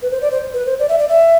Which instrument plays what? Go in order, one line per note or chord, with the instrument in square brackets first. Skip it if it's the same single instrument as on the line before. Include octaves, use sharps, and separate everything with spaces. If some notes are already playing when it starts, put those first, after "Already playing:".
[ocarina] B4
C5
D5
C5
B4
C5
D5
E5
D5
E5